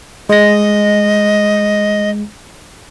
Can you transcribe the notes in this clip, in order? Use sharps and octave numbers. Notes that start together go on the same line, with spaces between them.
G#3 D#5 A#6